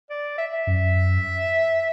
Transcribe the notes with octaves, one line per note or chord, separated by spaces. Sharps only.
D5
E5
E5
F#2